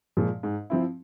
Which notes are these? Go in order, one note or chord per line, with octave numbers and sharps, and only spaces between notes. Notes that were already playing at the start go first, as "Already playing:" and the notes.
A#2 F3 G#3
G#2
F3 C4 E4